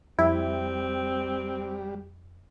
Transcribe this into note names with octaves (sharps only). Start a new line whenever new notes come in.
F2 G3 C4 E4